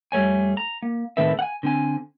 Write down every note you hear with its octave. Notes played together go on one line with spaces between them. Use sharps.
F2 G3 A3 C#5 G#5
A#5
A#3
A2 D#3 C4 A4 B4 E5
F#5 G#5
D3 C4 G#5